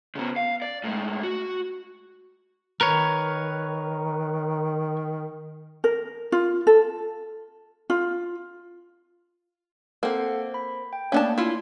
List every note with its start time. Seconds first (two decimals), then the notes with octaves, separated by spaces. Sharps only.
0.15 C#3 B3
0.36 F5
0.62 D5
0.84 A2 G#3
1.23 F#4
2.81 D#3 A#4 B4 C#5
5.84 A#4
6.32 F4
6.67 A4
7.90 F4
10.03 A#3 C4 A4 F#5
10.54 B5
10.93 G5
11.12 A3 A#3 C#4 D4 A5
11.38 E4 F4 C6